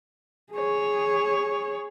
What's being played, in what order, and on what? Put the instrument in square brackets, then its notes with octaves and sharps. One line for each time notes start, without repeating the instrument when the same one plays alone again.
[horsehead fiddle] G#4 C#5